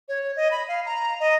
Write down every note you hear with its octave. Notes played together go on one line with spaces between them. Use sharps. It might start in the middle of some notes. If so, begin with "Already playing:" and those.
C#5
D#5
B5
F5
A#5
D#5